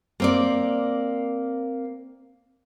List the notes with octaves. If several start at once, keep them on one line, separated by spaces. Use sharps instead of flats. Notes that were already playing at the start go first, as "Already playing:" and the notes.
A#3 C4 D5